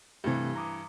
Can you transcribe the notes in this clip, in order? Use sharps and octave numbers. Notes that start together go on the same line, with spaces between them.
G2 C3 E3 A3 G4
A#5 D6 D#6